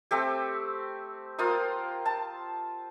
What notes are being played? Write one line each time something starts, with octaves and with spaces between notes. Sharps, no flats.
A3 C4 G4
A#3 F4 C5 D#6
A5